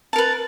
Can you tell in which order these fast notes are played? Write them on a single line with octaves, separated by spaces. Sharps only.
A5 A#4 B4